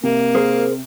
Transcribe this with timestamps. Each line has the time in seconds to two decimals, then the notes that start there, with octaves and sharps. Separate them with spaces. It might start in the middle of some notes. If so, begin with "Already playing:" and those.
0.03 C3 A#3
0.35 G#4 A#4 C5